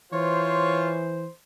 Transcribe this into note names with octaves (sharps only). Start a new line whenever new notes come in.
E3 F4 C5 C#5